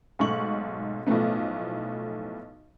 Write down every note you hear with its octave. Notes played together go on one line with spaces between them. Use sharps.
B1 G#2 A3 C#6 F#7
B1 A2 F3 A3 B3